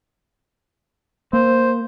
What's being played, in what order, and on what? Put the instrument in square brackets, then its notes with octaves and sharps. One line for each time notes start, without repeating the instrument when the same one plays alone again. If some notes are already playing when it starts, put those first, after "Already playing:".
[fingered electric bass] A#3 [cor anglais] C5